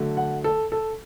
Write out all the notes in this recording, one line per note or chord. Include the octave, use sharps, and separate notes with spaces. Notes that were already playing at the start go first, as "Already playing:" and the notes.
Already playing: D3 F#3 A3
F#5
A4
A4